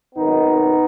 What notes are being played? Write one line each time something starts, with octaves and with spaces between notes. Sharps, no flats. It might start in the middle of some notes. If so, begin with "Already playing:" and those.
G#1 F#2 D#3 B3 D#4